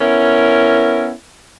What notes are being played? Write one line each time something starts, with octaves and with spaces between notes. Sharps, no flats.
B3 C#4 E4 A#4